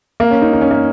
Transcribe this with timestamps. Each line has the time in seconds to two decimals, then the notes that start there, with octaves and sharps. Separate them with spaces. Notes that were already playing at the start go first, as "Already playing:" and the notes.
0.20 A#3
0.31 C#4
0.42 D#4
0.53 D#4
0.61 C#4
0.71 A#3